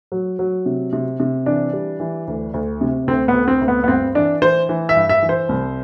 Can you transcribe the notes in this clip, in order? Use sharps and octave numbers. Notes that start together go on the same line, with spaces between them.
F#3
F#3
C3
C3
C3
E3 D4
G3
E3
D2
D2
C3
D2 C4
B3
D2
C4
D2
B3
B3
G2 C4
E3 D4
E3 C5
E3
E5
G2
E5
E3
C5
C2